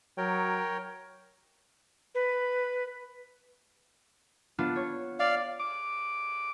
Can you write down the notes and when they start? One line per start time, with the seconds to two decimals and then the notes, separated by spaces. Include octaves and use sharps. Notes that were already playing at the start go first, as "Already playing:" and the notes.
0.18 F#3 A#4 C#5 G5
2.15 B4
4.58 B3 D4 F4
4.76 C#5
5.20 D5 F5
5.60 D6